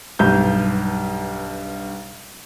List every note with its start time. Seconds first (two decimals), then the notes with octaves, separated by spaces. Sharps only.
0.19 B1 G2 G6